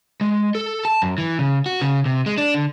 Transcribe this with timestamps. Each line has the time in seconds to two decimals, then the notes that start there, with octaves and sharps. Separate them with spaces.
0.21 G#3
0.55 A4
0.85 A5
1.02 F#2
1.18 E3
1.39 C#3
1.66 F#4
1.81 C#3
2.06 C3
2.26 G#3
2.38 D4
2.54 D3